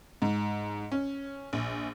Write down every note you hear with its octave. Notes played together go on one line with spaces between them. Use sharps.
G#2
C#4
A#1